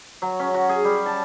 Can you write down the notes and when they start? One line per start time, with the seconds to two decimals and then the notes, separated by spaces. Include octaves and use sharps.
0.22 F#3
0.40 C#4
0.54 F#4
0.69 G#4
0.84 G3
1.06 A5